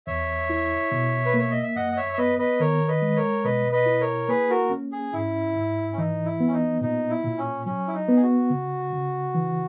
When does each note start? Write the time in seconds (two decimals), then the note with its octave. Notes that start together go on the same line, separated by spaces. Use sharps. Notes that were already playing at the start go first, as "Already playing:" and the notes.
0.07 E2 C#5 E5
0.50 E4
0.92 B2
1.26 B4
1.34 A#3 C#5
1.51 D#5
1.63 E5
1.76 F#2 D#5 F#5
1.92 D#5
1.97 C#5 E5
2.13 E5
2.18 B3 B4 D#5
2.39 B4 D#5
2.60 D#3 A#4 C#5
2.88 B4 D#5
3.02 G#3
3.16 A#4 C#5
3.44 B2 B4 D#5
3.72 B4 D#5
3.86 E4
4.01 A#4 C#5
4.28 A#3 G#4 B4
4.50 F#4 A#4
4.70 C#4
4.92 G#4
5.13 G#2 E4
5.56 G#2
5.93 C#4
5.97 E3 D#4
6.25 E4
6.40 B3
6.47 C#4
6.53 D#4
6.81 A#2 D#4
7.10 E4
7.24 A#2
7.38 C#4
7.66 F#3 C#4
7.88 E4
7.94 D#4
8.08 B3
8.16 G#4
8.22 F#4
8.50 C#3
8.93 C#3
9.35 E3